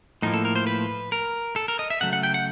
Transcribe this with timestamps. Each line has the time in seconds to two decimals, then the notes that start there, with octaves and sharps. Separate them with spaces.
0.22 A2 F3 A#3 D#4
0.34 A4
0.45 A#4
0.56 C5
0.67 B4
1.12 A#4
1.56 A4
1.68 A#4
1.79 D#5
1.90 E5
2.01 C#3 F#3 A3 F#5
2.13 F#5
2.23 G5
2.34 F#5